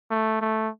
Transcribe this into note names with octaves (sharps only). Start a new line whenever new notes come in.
A3
A3